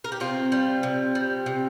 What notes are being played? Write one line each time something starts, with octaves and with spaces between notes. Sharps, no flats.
A#4
G4
C3 C4 F4
G3
C3
G3
C3